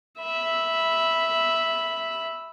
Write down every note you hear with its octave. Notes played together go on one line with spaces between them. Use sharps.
E5 B5